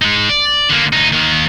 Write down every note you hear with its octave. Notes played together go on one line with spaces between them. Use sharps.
G#3 D#4
D5
D3 A#3
D2 D#4
D#2 D#3